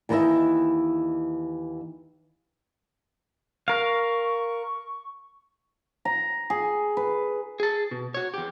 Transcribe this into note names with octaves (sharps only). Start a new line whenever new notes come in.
D#2 E3 D#4 A#4 D#5 E5
A#4 F5 C#6
A#5
G#4
B4
G#4 A5
B2
F#4 C#5
E2 G4